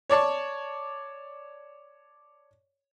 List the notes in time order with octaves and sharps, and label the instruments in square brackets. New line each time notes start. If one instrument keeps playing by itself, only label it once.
[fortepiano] C#5 D5 A5 C#6